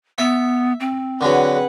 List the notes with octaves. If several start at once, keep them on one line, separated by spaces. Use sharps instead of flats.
B3 E5
C4
D3 F#3 G#4 B4 F#5